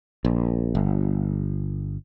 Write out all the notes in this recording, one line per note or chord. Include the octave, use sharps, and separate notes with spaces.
A#1
G1